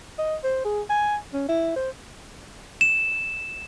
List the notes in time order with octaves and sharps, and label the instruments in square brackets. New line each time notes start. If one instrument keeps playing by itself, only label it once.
[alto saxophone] D#5
C5
G#4
G#5
C#4
E4
C5
[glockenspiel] E7